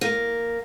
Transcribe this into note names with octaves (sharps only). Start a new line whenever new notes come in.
A#3